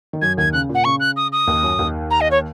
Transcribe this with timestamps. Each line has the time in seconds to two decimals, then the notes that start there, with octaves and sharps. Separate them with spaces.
0.13 D#3
0.22 F#2 F#3 G#6
0.37 D#2 D#3 G#6
0.53 C#3 F#6
0.69 A#2
0.75 F#5
0.84 C#3 C#6
1.00 F#6
1.16 D#6
1.32 D#6
1.47 D#2 D#3
1.63 F#2 F#3
1.79 D#2 D#3
2.11 A#5
2.21 D#5
2.31 C#5